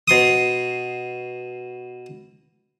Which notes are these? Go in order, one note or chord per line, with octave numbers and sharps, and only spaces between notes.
B2 C6 D#6